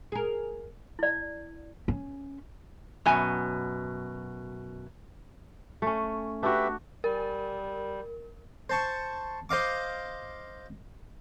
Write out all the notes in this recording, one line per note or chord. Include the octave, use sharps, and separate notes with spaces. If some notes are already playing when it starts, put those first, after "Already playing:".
G#4 A#4
E4 D5
C#4
F#2 B2 G#5
A3 C#4
D4 F#4 G4 B4 E5
G3 A#4
C5 A5 C#6
C5 D#5 F5 D6